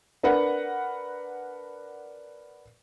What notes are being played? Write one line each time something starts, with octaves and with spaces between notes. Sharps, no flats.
D4 A#4 B4 F#5